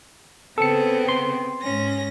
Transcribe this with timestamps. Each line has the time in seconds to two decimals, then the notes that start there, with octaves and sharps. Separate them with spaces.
0.58 C#3 B3 C4 A4 C#7
1.09 C6
1.62 G#2 C#4 A#6